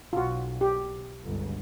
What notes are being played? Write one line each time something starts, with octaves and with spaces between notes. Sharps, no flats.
B1 F4 F#4
G4
G1 C#2